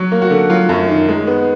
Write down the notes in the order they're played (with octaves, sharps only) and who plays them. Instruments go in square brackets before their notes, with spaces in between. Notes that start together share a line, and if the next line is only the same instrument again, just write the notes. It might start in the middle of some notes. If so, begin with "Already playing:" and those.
Already playing: [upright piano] F#3
A#3
F#4
D3
F#3 F4
F#2
D#3
G#3
B3